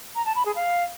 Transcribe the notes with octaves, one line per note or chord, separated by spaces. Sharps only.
A#5
A5
B5
G#4
F5